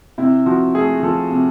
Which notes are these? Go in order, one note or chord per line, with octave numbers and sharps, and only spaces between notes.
C3 E4
F3 F#4
A3 G#4
F3 A4
C3